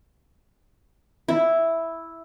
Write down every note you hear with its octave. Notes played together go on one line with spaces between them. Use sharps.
E4